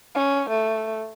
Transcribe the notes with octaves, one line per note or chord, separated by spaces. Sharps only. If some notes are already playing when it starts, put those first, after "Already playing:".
C#4
A3